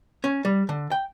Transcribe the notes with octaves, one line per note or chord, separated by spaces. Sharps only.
C#4
G3
D3
G5